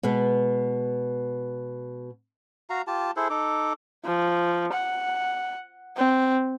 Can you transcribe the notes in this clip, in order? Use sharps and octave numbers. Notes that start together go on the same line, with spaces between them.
B2 G#3 B3
F#4 F5 A#5
F4 G4 A5
E4 G#4 A4 C5
D#4 A4 D6
F3
F#5
C4